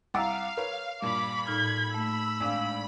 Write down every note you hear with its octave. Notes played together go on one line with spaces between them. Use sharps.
C2 F5 F#5 A#5 D6 E6 A6
A#4 B4 C#5
G2 A#2 B5 D6
A2 D#4 F6 G#6
A3 E6
G#1 G#3 D4 F5